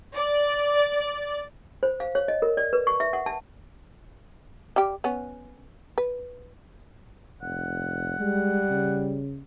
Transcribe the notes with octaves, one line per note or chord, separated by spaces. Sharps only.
D5
C5
F5
C#5
D#5
A#4
D5
B4
C#6
E5
F#5
A5
G3 G4
B3 C#4
B4
F1 F#5
G3 G#3
C#3